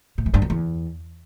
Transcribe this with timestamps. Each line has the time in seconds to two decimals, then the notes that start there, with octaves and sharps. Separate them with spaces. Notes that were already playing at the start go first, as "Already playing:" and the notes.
0.18 A2
0.26 E3
0.34 G2
0.42 F2
0.50 E2